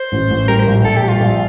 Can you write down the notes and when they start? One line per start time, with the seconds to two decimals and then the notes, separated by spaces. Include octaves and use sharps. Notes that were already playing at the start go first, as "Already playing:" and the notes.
Already playing: C5
0.12 A1
0.30 A1
0.48 G3 A#4
0.60 C5
0.66 A#1
0.84 A#1 A4
0.96 G4
1.03 G3
1.08 F4
1.20 A#1